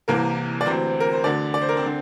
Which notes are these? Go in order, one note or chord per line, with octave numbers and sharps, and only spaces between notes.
C2 C3 E3 A#3 A#4
D5
D2 C3 E3 C4 C5
A#4
C5
D2 D3 D4 D5
D5
C5
A#4
C4 C5
D3